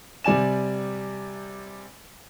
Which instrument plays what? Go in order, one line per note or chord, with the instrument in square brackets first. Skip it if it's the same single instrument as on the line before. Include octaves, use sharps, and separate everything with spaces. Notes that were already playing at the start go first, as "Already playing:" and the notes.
[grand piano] C3 G3 D5 G#5 E7